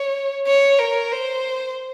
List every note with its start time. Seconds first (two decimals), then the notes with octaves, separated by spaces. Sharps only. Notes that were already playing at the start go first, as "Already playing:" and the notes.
Already playing: C#5
0.47 C#5
0.80 A#4
1.12 C5